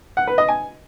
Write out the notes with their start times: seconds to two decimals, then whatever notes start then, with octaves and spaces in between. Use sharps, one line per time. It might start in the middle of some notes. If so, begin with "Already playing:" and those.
0.17 F#5
0.27 B4
0.38 D#5
0.48 G#5